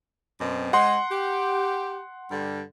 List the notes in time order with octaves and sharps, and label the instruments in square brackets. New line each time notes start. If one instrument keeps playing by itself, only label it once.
[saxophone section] F#2 B2 C4
[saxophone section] G#3 C5 [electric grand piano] F#5 C6
[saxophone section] G4
G2 D3 G3